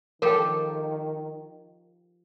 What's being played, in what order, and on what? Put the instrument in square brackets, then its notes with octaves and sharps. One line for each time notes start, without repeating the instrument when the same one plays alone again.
[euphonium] D#3 [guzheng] F3 G4 A4 [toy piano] A#4 G5